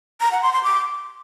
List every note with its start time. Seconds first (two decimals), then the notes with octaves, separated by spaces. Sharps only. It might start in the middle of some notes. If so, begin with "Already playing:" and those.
0.21 A#5
0.32 F#5
0.42 C6
0.53 C6
0.64 D6